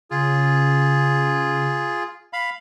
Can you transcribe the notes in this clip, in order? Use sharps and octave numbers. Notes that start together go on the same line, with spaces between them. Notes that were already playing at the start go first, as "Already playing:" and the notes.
C#3 F4 G#4
F5 B5